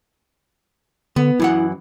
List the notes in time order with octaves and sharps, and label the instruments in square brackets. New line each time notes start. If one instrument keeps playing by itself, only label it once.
[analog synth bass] D3 [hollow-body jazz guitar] B3
[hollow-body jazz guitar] F#2 E3 F#5 [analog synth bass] E4